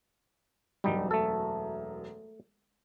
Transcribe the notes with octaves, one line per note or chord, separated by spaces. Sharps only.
E1 F#2 G3 D#4
A3 A4